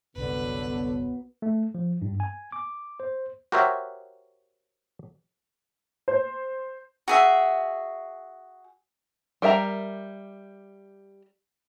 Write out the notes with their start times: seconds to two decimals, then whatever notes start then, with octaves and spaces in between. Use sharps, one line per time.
0.16 F#1 C2 D3 F#3 B3 B4
1.42 A3
1.75 F3
2.02 G2
2.20 G#5
2.52 D6
3.00 C5
3.52 F#4 G4 A#4 C5 C#5 E5
6.08 C5
7.08 F#4 G#4 E5
9.42 G3 A#4 E5 G5 A#5